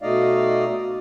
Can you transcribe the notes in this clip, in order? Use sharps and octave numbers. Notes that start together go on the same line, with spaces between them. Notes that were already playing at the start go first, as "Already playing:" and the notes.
B2 A3 D#4 D5 D#5 F5